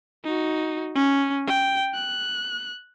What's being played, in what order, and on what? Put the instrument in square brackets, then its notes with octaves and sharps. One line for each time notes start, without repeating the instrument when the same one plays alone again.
[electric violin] D#4 F#4
C#4
G5
F#6